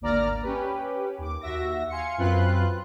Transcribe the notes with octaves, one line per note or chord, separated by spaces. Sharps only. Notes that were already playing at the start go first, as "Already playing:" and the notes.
G#1 D2 A#3 D5 A#5 F6
C#4 G4 B4
D#2 D6
D#2 F#4 E5 A#6
F5 G#5 C6 C#7
F#2 C4 F4 B4 C6 F#6